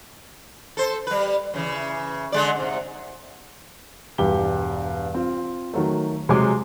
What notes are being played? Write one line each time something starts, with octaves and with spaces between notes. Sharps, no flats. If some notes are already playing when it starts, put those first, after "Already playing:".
A4 C5
G3 B4
F#2 C#3 E3
D3 G#3 D5
G#2 C3
E1 G2 G4 G7
C4 F4
D#3 F#3 A3
C3 F#3 G#3 G#4 G#5 D6